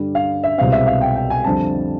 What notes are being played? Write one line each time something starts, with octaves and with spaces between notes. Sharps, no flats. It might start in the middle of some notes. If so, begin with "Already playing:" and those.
Already playing: G2 D3 G3
F5
E5
C2 B2 G#3 C4 F5
E5
F5
G5
G5
G#5
F2 D3 G3 C4 A5